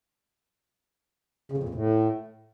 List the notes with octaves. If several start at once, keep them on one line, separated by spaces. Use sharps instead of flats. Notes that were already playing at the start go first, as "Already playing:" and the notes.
C#3
F2
A#2
F2
A2